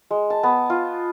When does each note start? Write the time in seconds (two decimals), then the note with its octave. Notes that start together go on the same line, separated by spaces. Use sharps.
0.11 G#3
0.30 A5
0.43 B3
0.70 F4